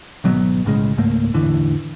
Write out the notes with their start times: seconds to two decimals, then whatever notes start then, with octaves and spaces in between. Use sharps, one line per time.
0.24 G#1 B2 F#3 B3
0.65 B1 A2 C#3 G#3
0.97 C#2 G#2 A3 A#3
1.34 E2 A2 D3 E3